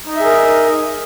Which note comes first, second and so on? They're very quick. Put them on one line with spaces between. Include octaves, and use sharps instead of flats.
D#4 D#5 E5 G#4 A#4